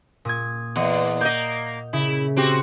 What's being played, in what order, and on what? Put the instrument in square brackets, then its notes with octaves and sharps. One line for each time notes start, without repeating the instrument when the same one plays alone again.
[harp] A#2 D#6 G#6
[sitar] E2 [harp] D#5 F#5
[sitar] A#3 D#5 [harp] G6
[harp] C#3 [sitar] E4
[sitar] C4 F#4 G4